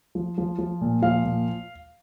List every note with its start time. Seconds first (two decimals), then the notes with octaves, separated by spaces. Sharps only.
0.15 F3
0.38 F3
0.59 F3
0.81 A#2
1.02 F3 F5
1.24 A#2